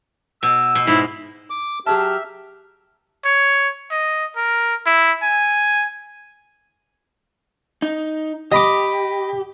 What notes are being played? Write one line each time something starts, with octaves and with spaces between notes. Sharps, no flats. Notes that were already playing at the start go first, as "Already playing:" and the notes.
B2 E6
B2
G#2 E4
D6
F#3 G4 G#4 E5 A5 F6
C#5
D#5
A#4
E4
G#5
D#4
G4 D#5 B5 D6